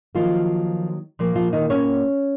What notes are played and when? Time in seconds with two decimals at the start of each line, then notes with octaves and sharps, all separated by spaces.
0.15 D#3 F3 F#3 A#3 F4
1.19 A#2 F3 A#3
1.36 F3 F4
1.53 D#3 D#4
1.70 C#4 C#5